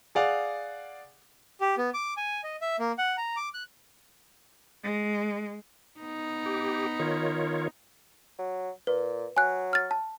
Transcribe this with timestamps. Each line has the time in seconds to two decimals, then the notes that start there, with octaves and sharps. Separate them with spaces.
0.15 G#4 D5 F5 F#5
1.61 G4
1.78 B3
1.94 D6
2.17 G#5
2.44 D#5
2.61 E5
2.79 A#3
2.98 F#5
3.17 A#5
3.36 D6
3.54 F#6
4.83 G#3
6.00 B3 D#4
6.46 G4
7.00 D#3 F4 C#5
8.39 F#3
8.87 A#2 B4
9.37 F#3 G#5 F#6
9.73 F6 A6
9.91 A5